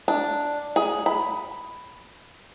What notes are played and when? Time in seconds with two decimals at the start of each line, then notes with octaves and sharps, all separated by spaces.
0.08 D4
0.76 G#4
1.06 B5